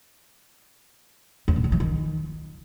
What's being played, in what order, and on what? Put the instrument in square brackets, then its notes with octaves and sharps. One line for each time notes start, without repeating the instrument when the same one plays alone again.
[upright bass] E2
A#2
D3
E3
D#3